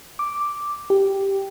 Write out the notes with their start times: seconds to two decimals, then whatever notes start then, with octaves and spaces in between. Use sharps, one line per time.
0.19 D6
0.90 G4